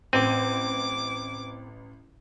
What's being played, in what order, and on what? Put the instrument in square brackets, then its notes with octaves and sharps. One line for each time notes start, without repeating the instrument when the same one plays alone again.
[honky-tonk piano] A1 D#7 [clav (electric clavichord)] C4 [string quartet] D6